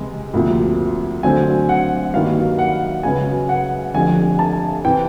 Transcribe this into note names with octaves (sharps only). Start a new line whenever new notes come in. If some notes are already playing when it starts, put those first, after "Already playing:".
Already playing: C#2 C3 E3 G#3
D2 C3 F3 A#3
F#2 D3 F#3 A3 C4 G#5
F#5
G2 D#3 F#3 A#3 F5
F#5
C#2 C#3 F#3 B3 G#5
F#5
F1 F2 D3 G#5
A5
C3 E3 G5